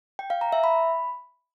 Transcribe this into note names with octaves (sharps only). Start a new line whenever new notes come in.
G5
F5
A#5
E5
B5